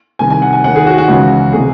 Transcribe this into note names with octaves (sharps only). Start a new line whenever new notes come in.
C2 C3 D#3 G#5
G#5
F#5
G#5
D#2 D#3 F#5
G#4
F#4
F#4
C#2 C#3 E3
C3 E3 G#4